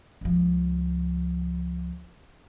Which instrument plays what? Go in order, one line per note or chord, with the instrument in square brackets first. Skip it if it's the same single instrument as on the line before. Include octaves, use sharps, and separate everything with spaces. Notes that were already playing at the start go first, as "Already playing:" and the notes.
[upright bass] C#2 F3